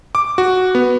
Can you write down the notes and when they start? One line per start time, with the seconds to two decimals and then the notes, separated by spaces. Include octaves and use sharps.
0.15 D6
0.38 F#4
0.75 B3